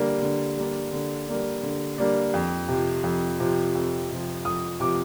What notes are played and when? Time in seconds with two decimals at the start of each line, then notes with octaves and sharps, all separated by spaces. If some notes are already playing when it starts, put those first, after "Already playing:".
Already playing: D3 G3 A#3 D4
0.23 D3
0.58 G3 A#3 D4
0.93 D3
1.28 G3 A#3 D4
1.63 D3
1.98 G3 A#3 D4
2.34 F2
2.68 C3 F3
3.04 F2
3.40 C3 F3
3.75 F2
4.10 C3 F3
4.45 F2 D#6
4.80 C3 F3 D6